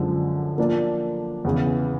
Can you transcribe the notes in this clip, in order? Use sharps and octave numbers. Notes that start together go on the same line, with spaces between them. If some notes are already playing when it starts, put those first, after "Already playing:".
Already playing: F#2 D3 F3 G#3
F3 A#3 D4
E2 C#3 E3